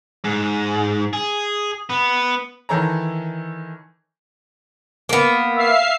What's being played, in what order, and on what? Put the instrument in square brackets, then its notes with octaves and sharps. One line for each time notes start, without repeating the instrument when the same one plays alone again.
[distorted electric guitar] G#2
G#4
B3
[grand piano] D#3 E3 A4 C#5 A5 A#5
[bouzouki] A#3 B3
[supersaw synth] E5 F5 C7